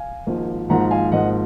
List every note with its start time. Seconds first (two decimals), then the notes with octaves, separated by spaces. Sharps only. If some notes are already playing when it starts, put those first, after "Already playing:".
Already playing: F5 G#5
0.27 G#1 G#2 F3 A#3
0.69 G#1 G#2 F3 A#3 F#5 A#5
0.91 F5 G#5
1.12 G#1 G#2 F3 A#3 D#5 F#5